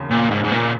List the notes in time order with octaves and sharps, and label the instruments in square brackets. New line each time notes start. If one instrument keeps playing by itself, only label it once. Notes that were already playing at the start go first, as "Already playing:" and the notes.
Already playing: [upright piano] E1 D#2 C#3
[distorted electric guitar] A#2
G#2
G#2
A#2